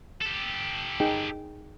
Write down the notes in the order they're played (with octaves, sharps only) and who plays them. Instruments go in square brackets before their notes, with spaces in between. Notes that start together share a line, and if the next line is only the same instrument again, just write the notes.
[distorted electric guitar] G4 A4
[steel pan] D#4 G#4 G5